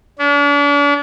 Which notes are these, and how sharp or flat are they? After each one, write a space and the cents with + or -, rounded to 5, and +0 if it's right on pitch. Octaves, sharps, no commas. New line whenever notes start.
D4 -40